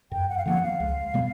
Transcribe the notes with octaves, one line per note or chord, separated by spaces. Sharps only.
F#2 G5
F#5
F5
D3 F3 A#3 F#5
F5
C#2
B2 G3 B3